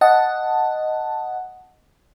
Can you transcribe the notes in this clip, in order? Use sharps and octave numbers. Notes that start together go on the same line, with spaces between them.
D#5 F#5 A5